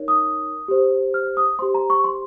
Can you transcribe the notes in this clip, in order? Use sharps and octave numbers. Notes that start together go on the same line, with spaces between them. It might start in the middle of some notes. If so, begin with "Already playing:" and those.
Already playing: D#4 A#4 C#5
D#6
G4 C5
F6
D#6
G4 C5 C6
A#5
C#6
C6